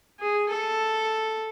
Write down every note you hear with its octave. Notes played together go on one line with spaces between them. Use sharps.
G#4
A4